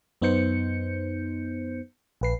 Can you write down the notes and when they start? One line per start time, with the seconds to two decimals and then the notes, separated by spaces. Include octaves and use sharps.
0.22 F#2 B3 D#4 C5 G6 C#7
2.21 A#1 B4 C7